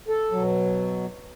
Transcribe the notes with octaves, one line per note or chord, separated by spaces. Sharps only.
A4
B2 F#3